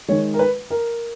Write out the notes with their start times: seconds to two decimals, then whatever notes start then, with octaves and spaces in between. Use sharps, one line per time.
0.08 D#3 G#3 C#5
0.34 A#4
0.39 B4
0.71 A#4